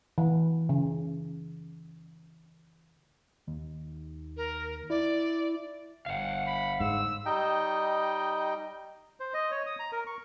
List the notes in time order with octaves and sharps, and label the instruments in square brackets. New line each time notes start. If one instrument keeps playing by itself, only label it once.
[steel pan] E3
C#3
[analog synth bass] D#2
[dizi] A#4
[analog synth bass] E4 [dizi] D5
[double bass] G1 [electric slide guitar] F5 F#5
[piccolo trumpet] B5
[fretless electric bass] G#2 [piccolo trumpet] E6
[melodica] G3 D#4 D#5 G5
[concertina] C5
D#5
C#5
D#6
A#5
A#4
C#6